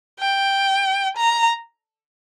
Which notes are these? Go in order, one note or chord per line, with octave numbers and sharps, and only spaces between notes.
G5
A#5